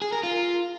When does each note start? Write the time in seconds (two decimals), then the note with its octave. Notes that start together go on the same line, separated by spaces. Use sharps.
0.02 G#4
0.13 A#4
0.23 F4